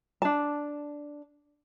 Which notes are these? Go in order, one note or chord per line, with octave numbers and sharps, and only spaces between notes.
D4 A5